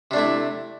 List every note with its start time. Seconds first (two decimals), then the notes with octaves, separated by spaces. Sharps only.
0.11 C3
0.13 D4
0.16 A3
0.18 E4